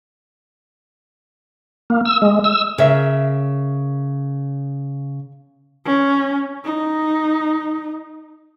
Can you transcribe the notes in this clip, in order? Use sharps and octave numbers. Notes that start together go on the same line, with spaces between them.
A#3
E6
G#3
E6
C#3 A#4 C#5 E5
C#4
D#4